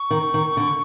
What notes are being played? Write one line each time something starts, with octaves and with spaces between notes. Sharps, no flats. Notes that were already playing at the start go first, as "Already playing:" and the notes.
Already playing: C#6
D#3
D#3
D3